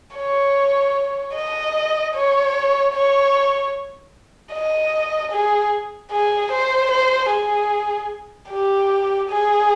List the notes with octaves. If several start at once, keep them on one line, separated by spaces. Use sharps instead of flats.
C#5
D#5
C#5
C#5
D#5
G#4
G#4
C5
C5
G#4
G4
G#4